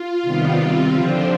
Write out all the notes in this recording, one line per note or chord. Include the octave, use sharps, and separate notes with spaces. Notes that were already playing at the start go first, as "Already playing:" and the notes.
Already playing: F4
C3 D#3 G3 B3
C3 G3 C4
D3 F3 C4 D4